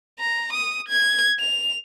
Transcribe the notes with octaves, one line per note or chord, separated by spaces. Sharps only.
A#5
D#6
G#6
F7